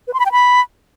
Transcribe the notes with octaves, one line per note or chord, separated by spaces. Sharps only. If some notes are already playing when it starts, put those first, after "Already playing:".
B4
C6
B5
G5
B5